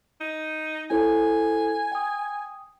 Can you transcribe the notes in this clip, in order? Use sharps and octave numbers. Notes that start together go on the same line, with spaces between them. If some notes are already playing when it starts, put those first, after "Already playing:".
D#4
E4 A4 C5 G#5
G5 D#6